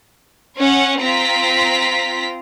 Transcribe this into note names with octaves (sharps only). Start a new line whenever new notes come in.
C#4 C#5 F#5
C4 F4 A#5 B6